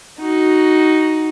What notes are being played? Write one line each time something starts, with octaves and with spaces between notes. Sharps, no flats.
D#4 F#4